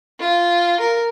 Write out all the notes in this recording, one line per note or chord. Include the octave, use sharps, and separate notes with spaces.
F4
A#4